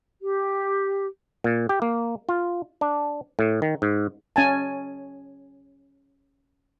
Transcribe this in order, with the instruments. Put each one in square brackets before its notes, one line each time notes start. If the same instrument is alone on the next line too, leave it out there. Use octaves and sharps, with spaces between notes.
[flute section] G4
[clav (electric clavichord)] A#2
G4
A#3
F4
D4
A2
D#3
G#2
[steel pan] C#4 G#5 A5